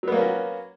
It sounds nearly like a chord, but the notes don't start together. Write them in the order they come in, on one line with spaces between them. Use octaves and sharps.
F#3 B3 A#3 C#4 F#4